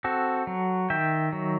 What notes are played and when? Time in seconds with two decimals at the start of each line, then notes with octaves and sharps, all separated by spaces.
0.04 C4 F#4 A4
0.47 F#3
0.90 D#3 E5 G5
1.33 F#3